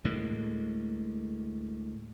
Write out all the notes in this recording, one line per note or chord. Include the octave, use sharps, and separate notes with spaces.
D2 A2 G#3 A#3